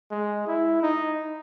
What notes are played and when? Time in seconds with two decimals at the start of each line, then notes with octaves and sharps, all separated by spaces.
0.11 G#3
0.47 E4
0.82 D#4